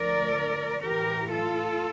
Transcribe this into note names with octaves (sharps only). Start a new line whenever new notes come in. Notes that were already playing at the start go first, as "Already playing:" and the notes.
Already playing: D2 D3 F3 A#4 D5
A2 E3 G4 A#4
F4 A4